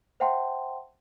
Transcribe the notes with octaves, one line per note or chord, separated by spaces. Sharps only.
C5 E5 F#5 G5 A5 C6